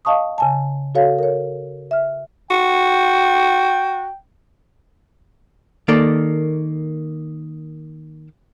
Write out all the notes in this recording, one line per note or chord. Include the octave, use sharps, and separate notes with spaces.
D#5 F5 A5 C#6 D#6
C#3 G#5 A5
F#4 A4 C#5 F5
A#4 C#5
E5 F6
F#4 G5
D#3 A#3 A4 D5